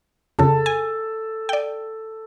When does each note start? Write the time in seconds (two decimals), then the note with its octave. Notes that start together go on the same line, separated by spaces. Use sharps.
0.39 F2 C#3 A4
0.66 G#5
1.49 D5 G5